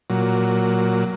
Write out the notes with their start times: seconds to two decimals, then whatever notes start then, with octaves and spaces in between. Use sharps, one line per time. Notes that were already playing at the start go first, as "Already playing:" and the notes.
0.10 A#2 F#3